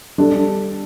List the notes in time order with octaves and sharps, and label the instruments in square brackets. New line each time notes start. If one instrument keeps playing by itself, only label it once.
[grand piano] G3 D4 A4